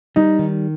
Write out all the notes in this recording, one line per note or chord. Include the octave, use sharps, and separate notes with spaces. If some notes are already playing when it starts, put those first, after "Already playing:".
G3 D#4
D#3